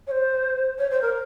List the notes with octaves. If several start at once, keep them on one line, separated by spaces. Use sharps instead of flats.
C#5
C5
C#5
C5
A#4